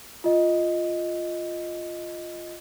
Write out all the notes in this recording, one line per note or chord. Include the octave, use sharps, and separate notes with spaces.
F4 D#5